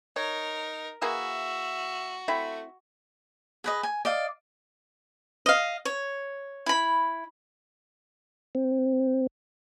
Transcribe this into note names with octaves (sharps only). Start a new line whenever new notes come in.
D#4 A#4 C#5
E3 A#3 F#4 G#4 E5
A3 C4 E4 E5
G#4 B4 D#5
G#5
D5 D#5 F5
D#5 F5
C#5
E4 B5
C4